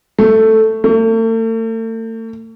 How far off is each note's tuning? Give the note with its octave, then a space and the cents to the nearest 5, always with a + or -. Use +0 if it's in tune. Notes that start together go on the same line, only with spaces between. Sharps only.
A3 +5
A3 +40